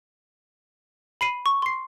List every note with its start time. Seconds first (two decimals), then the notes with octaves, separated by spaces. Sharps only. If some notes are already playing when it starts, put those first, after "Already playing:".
1.21 B5 C7 D#7 F#7
1.46 C#6
1.62 C6 C7